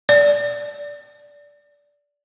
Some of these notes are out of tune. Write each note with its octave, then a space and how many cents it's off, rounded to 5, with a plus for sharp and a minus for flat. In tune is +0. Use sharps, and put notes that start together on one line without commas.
D5 -20